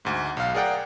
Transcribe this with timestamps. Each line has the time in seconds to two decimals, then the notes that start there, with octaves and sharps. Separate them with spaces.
0.05 D2 G#2
0.37 B1 F5
0.54 G#4 A#4 D5 F#5 G5